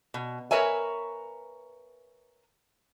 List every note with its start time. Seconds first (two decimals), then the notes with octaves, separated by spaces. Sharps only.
0.14 B2
0.51 A#4 B4 C#5 E5 G#5